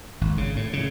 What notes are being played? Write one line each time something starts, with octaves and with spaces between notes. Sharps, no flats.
G#1
C#3
A2
C#3